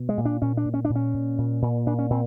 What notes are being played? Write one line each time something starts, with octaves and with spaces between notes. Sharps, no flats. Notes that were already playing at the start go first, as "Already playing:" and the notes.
Already playing: B2
G#3
A#2
D4
A#2 C#4
D4
A#2
C#4
D4
A#2
C#4
A#2
A#2
A#2
A#2 D4
C#4
A#2 C4